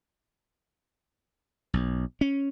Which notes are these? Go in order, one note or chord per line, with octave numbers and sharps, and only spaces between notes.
B1
C#4